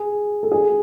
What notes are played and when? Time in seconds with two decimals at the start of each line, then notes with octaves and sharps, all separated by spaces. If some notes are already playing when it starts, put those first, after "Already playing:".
Already playing: G#4
0.43 A4
0.52 G#4